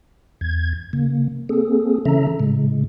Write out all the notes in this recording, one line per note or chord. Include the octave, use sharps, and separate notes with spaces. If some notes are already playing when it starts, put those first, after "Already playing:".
E2 G#6
C#3 A#3
A#3 C4 G#4 A4
C#3 E3 C#4 A4 E5 A#5
A2 C#3 G#3